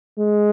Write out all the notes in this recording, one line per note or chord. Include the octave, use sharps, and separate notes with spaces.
G#3